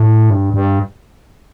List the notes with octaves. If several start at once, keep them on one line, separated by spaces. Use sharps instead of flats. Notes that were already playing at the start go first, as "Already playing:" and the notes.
Already playing: A2
G2
G2